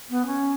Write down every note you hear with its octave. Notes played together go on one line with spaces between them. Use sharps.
B3
C#4